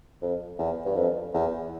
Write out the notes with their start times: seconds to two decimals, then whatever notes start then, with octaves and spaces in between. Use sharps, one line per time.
0.22 F2
0.58 E2
0.85 G2
0.96 F2
1.34 E2